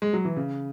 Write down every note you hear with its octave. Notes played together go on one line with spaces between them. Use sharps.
G#3
F#3
E3
C#3